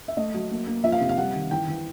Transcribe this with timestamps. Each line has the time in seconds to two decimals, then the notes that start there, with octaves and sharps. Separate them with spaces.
0.08 E5
0.17 A3 D#5
0.34 F#3
0.51 A#3
0.67 A#3
0.84 F3 E5
0.92 F5
1.01 C3
1.09 F5
1.18 G3 F#5
1.34 D#3
1.51 E3 G5
1.68 E3